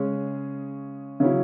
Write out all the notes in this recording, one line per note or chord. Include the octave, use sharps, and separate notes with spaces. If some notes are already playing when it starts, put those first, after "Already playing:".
Already playing: C#3 G#3 C#4 G#4
C#3 F#3 C#4 E4